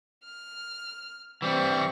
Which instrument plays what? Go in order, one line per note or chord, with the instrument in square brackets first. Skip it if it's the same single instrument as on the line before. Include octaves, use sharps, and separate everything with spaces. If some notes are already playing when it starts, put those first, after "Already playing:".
[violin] F6
[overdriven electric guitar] E3 G3 [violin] C4 C#6